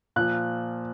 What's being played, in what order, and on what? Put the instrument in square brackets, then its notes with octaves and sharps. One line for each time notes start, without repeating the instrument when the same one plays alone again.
[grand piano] A#2 F3 F#6